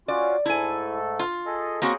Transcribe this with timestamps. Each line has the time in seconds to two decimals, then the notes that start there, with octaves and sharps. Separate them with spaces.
0.08 C#4 F4 F#4 D5
0.46 G#2 A3 E4 A4 G#5
1.19 F4
1.46 G#4 A4 D#5
1.82 A#3 C4 C#4 F#4 G#4 D#5